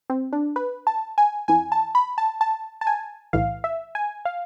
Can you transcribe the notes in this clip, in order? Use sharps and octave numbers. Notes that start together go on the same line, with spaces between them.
C4
D4
B4
A5
G#5
F2 E3 G#5
A5
B5
A5
A5
A5
G#5
B1 A2 E3 F5
E5
G#5
F5